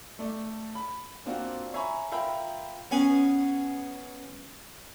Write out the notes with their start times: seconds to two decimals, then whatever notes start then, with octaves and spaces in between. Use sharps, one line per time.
0.19 A3 D5
0.75 B5
1.26 A#3 C4 D4 F4 F#4
1.73 C#5 E5 G#5 A#5 B5 C#6
2.12 F4 A#4 E5 G5 A#5 B5
2.91 B3 C#4 G#4 G#5